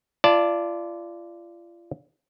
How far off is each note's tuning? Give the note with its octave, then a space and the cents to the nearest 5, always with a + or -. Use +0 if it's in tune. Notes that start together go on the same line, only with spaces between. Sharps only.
F4 -35 D5 +0 A5 +0